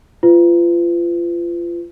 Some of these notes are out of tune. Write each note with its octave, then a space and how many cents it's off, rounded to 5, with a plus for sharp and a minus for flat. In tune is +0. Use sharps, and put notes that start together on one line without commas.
F4 -25 B4 +35